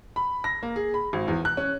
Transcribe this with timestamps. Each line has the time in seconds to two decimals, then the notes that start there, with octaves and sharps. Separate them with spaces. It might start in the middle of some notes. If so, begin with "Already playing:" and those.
0.16 B5
0.44 A#6
0.63 A#3
0.76 G#4
0.94 B5
1.13 G#1
1.28 E2
1.45 F#6
1.57 C#4